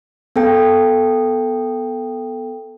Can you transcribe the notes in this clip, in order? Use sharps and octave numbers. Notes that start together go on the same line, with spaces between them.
B3 A4 G5